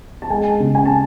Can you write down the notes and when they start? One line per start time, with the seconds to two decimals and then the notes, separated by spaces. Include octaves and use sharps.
0.22 A5
0.30 G#3 G#5
0.60 C#3
0.75 G#5
0.86 A5